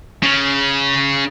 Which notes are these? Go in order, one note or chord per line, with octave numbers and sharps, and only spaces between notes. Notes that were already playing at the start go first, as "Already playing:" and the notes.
C#3